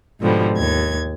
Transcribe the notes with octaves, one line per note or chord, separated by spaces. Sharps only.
G#2 B2 D3 F3 G3
D#2 G#6